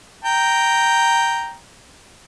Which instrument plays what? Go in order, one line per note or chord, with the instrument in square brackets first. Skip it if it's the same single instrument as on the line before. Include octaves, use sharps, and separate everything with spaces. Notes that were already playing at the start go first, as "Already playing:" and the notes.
[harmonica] G5 A#5